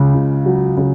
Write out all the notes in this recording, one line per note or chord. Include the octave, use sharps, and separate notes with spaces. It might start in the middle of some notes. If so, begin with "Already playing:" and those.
Already playing: C#2 C#3
C#2
F#3
C#3